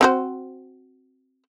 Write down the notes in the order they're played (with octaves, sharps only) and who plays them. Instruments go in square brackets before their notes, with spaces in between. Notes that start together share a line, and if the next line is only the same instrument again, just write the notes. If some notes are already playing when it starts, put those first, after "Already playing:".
[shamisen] C4 F#4 C5